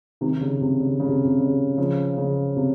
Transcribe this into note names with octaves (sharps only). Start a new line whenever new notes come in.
C3 D#3
C#3
C3
C#3
C#3
C3
C3
C#3
C#3 F3
C#3
C3